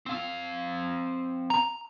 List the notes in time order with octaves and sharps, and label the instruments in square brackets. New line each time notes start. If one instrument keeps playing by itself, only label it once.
[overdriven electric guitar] C4 F5
[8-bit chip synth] A#5